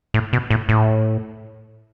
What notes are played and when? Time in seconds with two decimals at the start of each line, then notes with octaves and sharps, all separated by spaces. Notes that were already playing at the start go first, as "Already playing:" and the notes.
0.14 A2
0.33 B2
0.50 A2
0.69 A2